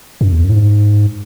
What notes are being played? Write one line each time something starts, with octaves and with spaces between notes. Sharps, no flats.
F#2
E2
F#2
A2
G#2